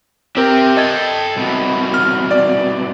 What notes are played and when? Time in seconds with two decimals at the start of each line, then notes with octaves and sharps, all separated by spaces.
0.37 C4 G4 A#4 E5
0.77 A4 D#5 G5 G#6 A6
1.36 C2 B2
1.94 F6
2.31 D5